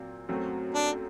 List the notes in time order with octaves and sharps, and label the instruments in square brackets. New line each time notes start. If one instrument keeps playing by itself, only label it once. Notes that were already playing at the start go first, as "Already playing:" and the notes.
Already playing: [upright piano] A#2 F#3 C4
F#2 F#3 A3 C4 F#4
[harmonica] D4